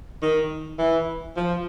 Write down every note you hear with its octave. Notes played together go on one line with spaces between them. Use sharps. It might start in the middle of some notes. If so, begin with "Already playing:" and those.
D#3
E3
F3